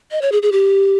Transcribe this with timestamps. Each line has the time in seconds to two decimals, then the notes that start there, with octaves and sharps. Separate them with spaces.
0.11 D#5
0.22 C#5
0.32 G#4
0.42 G#4
0.52 G4